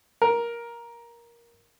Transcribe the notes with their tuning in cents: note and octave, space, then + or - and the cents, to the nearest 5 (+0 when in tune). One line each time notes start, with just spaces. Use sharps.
A#4 +10